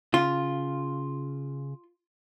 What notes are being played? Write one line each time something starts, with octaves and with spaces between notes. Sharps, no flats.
C#3 F4